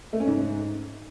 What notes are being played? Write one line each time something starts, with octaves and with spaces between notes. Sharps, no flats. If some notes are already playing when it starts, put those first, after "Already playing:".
A3
C#4
G#2